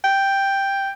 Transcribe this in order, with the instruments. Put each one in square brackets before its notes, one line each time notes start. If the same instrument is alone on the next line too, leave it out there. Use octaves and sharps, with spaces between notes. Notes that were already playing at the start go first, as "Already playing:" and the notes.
[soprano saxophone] G5